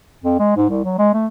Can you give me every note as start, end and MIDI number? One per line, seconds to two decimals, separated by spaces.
0.24 0.37 41
0.40 0.52 56
0.56 0.67 44
0.70 0.83 36
0.85 0.96 54
0.99 1.12 56
1.14 1.27 57